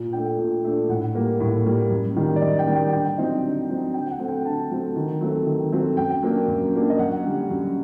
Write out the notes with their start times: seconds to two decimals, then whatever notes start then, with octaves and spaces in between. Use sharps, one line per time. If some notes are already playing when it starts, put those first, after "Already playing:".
Already playing: A#2
0.13 A3 D4 G5
0.38 A#2
0.65 A3 D4
0.89 A2 F#5
1.15 G3 A#3
1.40 A2
1.66 G3 A#3
1.91 F#2
2.16 D#3 G3
2.36 D5
2.42 F#2 D#5
2.59 G5
2.67 D#3 G3
2.76 G5
2.93 D3 G5
3.18 F#3 C4 D#4
3.44 D3
3.69 F#3 C4 D#4
3.94 D3 G5
4.11 F#5
4.19 F#3 A3 C4
4.28 G5
4.45 D3 A5
4.71 F#3 A3 C4
4.96 D#3
5.21 F#3 A3 C4
5.47 D#3
5.72 F#3 A3 C4
5.97 F#2 G5
6.23 F#3 A#3 D4
6.48 F#2
6.74 F#3 A#3 D4
6.90 D#5
6.99 F#2 F#5
7.24 D3 G3
7.50 F#2